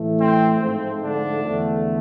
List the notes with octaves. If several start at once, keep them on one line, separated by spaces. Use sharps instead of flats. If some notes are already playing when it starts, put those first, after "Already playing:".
Already playing: A2 E3 A3
C4
G#2 F3 A3 C4
D3 D4
E2 D3 A3